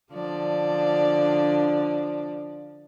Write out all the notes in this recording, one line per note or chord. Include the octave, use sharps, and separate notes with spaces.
D3 F3 D5